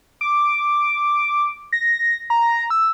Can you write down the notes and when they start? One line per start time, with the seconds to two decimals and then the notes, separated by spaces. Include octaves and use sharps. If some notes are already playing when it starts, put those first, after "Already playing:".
0.21 D6
1.73 A#6
2.30 A#5
2.70 E6